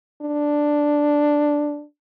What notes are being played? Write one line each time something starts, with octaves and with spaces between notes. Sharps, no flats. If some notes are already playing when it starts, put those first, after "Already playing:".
D4